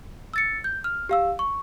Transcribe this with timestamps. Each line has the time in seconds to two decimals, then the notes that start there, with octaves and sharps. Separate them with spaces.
0.34 E6 A6 C#7
0.64 G6
0.84 F6
1.09 G4 F5 E6
1.39 C#6